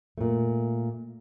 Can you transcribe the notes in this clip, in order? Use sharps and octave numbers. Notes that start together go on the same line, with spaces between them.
A#2 A3